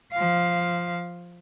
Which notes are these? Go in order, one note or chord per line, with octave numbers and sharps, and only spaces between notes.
F3 F5